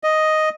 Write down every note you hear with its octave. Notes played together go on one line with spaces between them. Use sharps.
D#5